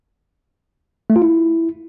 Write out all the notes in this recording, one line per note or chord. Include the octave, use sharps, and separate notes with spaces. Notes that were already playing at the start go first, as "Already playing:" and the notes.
A3
F4
E4